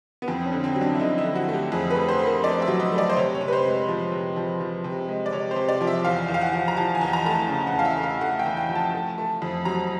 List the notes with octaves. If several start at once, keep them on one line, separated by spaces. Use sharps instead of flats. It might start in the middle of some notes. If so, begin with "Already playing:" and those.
B3
F2 C4
C#4
D3
C4
F#3
D4
E4
D3 D#4
E4
D3
F#4
A3
G4
F2 G#4
B4
A3
C5
A3
A#4
A3 D5
E5
F#3
D#5
A3
D5
C5
C3 C#5
C#5
C3
B4
C5
G#3
F3
C3
F3
F3
C3
G#3
D5
C3 C#5
C5
C3
D5
F3
E5
E2 F5
E2
F5
F#5
F3
A#5
F3 A5
G#5
E2
A#5
A3 A#5
A5
C#3
F#5
E2
F5
E5
A3
F5
A3 F#5
G5
E2
G5
F3
A5
A3
A3
F2
F#3 A#5